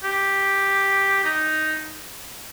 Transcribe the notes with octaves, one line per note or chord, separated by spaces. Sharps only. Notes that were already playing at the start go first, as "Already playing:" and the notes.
G4
D#4